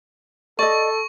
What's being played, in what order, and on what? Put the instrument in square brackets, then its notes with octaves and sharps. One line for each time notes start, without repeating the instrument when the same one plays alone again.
[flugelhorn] A4 [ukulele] D5 D#5 [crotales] C#6